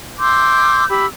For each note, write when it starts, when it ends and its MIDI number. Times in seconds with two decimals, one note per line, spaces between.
0.18 0.85 84
0.18 0.85 86
0.18 0.85 88
0.18 0.85 91
0.89 1.05 67
0.89 1.05 83
0.89 1.05 88